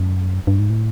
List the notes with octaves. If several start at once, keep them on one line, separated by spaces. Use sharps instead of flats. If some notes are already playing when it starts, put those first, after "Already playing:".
Already playing: F#2
G2
G#2
A2